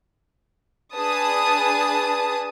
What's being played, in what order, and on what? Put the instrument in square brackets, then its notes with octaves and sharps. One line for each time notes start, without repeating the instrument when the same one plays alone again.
[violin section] D4 G#4 B4 A5 D#6